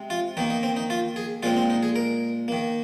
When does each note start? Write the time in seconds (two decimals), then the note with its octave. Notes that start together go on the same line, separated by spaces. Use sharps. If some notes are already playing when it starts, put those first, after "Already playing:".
Already playing: C3 G#3 C4
0.10 F4
0.37 D#3 A#3 D#4
0.50 D#4
0.63 C4
0.77 D#4
0.90 F4
1.16 G#4
1.43 A#2 G#3 C4 F4
1.56 C4
1.70 D#4
1.83 G#4
1.96 A#4
2.48 D#3 A#3